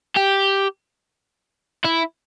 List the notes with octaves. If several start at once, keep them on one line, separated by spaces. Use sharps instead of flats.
G4
E4